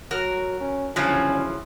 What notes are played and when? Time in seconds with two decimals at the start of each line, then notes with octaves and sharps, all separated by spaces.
0.11 F#3 F#4 A#4
0.60 C#4
0.96 G1 C#3 F3 F#3 C#4 E4 G#5